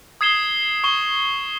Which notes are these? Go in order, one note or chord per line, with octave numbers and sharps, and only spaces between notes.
D#6 G#6 C7 E7 G7
C#6 E7 G7